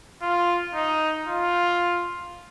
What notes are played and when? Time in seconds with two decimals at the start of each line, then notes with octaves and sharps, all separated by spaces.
0.22 F4
0.74 D#4
1.26 F4